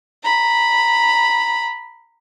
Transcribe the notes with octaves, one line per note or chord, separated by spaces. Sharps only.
A#5 B5